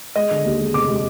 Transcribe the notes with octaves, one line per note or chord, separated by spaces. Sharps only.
G#3 D#5
D3
D#2
G#3
F1 D6
G#3